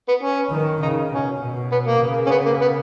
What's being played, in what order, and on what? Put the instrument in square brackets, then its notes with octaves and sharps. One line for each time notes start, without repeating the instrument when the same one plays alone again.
[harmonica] B3
C#4
[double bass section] D#3
[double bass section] C#3 [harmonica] D#4
[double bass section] B2 [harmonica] C#4
[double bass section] B2
[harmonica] B3
A#3
[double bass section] C#3
[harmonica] C#4
B3
A#3
B3